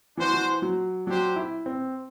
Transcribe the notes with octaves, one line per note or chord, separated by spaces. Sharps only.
E3 D4 F#4 C5
E3
F#3
F#3 D4 G4 C5
E4
C4